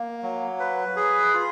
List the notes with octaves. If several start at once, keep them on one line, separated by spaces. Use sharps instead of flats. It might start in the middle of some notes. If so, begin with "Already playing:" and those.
Already playing: A#3
F#3
B4
G#4
F4